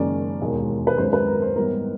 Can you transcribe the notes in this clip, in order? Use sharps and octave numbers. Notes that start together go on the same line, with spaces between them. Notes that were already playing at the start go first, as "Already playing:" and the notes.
Already playing: F#1 F#2 D#3 G#3 C#4 D5
E1 D#2 D#3 G#3
B4
G#1 F#2 D#3 G#3 C5
B4
A#4
C5
G#2 E3 G3 B3 E4 A#4